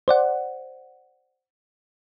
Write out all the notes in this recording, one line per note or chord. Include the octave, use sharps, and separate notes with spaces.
C5 D5 F#5